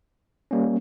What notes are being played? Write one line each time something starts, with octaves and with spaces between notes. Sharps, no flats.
G3 A#3 C#4